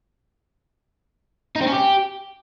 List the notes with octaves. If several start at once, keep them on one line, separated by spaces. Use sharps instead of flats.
D#4
C4
C#4
G4